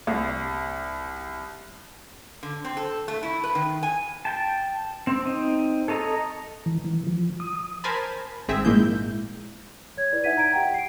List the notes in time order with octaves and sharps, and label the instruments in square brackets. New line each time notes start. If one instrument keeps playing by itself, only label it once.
[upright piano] C2
[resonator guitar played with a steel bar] D3
C4
A4
A3
E4
B4
D#3
G#5
[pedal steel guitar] G5 A5
C4
C4 D#4
A4 C#5 D#5 A#5
[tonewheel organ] E3
E3
F3
D#6
[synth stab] A#4 C5 G#5 A5 B5
G#1 C4 G#4 E5
A#1 G#2 G#3 A#3 E4 G6
[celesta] C#5 G#6
E4 B4 D5
D#4 E5 F#5 G#6 B6 D#7
A#5 G#6 D7
G4 F#5 G5
C7 D7